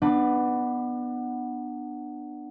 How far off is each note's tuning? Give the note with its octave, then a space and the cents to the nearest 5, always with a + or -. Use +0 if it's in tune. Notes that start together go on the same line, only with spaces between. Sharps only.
B3 +0 D4 +30 D6 -5